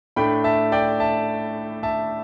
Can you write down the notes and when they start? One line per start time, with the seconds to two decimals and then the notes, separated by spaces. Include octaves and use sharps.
0.16 A2 A3 D4 G5 B5
0.44 E5 A5
0.72 D5 G5
1.00 E5 A5
1.83 E5 A5